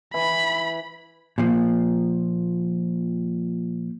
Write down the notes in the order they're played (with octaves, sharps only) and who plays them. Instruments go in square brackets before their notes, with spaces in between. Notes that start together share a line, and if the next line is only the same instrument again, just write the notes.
[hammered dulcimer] E3 [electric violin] B5
[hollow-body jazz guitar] A#2 F3